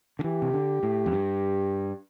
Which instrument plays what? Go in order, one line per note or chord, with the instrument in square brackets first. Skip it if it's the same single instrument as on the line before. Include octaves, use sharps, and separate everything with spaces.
[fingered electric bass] D3
[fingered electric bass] E3 [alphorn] G4
[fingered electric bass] C3
D3
A2
F2
G2